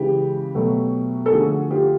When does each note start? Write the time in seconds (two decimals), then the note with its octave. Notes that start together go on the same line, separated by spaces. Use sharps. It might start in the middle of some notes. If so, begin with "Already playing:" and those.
Already playing: C#3 E3 G#3 G4
0.55 B2 F#3 A3
1.26 A4
1.31 D3 F3 A3 F#4 G#4
1.71 F4 G4